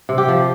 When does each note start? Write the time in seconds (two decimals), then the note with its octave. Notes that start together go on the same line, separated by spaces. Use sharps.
0.09 C3
0.18 G4
0.28 F3